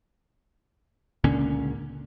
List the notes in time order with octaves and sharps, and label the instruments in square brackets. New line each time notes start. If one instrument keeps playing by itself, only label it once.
[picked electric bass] C#2 A#2 D3 C#4